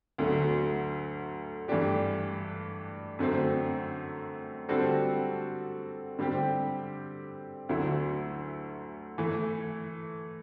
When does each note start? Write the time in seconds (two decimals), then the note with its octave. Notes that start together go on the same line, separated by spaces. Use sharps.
0.18 D2 D3 F#3 A3
1.68 G2 E3 A3 D4 G4
3.19 F#2 D3 A3 C4
4.69 D3 G3 C4 F#4 A4
6.19 D3 G3 C4 G4
7.69 D2 D3 F#3 A3 E4
9.18 E3 A3 E4